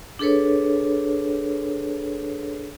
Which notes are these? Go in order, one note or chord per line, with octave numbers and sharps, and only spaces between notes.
D4 G#4 A4 B4 C#5